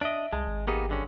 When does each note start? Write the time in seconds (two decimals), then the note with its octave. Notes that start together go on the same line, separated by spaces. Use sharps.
0.01 D4 D#5 E5 D7
0.33 C2 G#3 A5
0.47 G#1
0.67 A#3 B3 D#4 G4 G#4
0.89 G2 D3 C#4